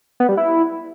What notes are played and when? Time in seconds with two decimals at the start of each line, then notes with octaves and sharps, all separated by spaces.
0.20 B3
0.29 G3
0.37 E4